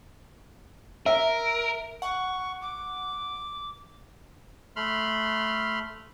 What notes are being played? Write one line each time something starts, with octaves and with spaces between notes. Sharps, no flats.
A#4 E5
F#5 C#6
D6
A3 B5 C6 F6